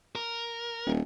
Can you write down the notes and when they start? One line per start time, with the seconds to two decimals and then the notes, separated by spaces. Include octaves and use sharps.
0.15 A#4
0.86 D#1